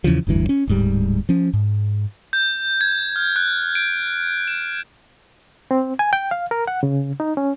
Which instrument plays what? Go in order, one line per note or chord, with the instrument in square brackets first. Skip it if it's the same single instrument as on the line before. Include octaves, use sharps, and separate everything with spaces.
[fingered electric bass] E2 C#3 E3 F3
F1 D2 G2 E3
C#4
D1 G#2 G3
F3 C#4
G#2
[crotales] G6
G#6
F6
F#6
D7
E7
[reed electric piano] C4
G#5
G5
F5
A#4
F#5
C#3
D#4
C#4